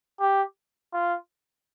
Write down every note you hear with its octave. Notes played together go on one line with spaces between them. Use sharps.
G4
F4